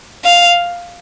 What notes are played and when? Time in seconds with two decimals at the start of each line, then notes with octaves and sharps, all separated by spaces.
0.25 F5